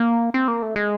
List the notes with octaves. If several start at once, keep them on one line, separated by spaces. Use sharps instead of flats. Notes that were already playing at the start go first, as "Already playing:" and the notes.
Already playing: A#3
C4
A#3
A3
G#3